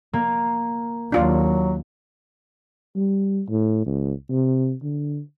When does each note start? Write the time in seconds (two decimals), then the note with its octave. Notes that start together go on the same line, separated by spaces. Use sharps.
0.13 A#3
1.12 D#2 F#3 D4 F4 D5
2.96 G3
3.49 A2
3.86 C#2
4.30 C3
4.83 D3